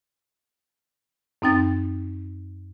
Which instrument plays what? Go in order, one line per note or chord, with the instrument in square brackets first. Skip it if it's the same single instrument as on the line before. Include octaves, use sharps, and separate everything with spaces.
[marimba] F#2 C4 D#4 G5 A6